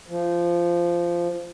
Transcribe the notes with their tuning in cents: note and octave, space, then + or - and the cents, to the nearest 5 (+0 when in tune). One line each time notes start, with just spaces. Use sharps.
F3 -15